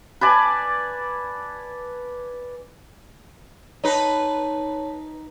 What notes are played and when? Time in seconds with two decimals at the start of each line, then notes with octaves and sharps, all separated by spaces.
0.21 B4 D5 G#5 A5
3.84 D#4 B4 C#5 A5